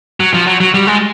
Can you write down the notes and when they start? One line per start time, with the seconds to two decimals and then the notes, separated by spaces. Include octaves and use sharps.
0.20 F#3
0.34 F3
0.47 F#3
0.60 F#3
0.74 G3
0.87 G#3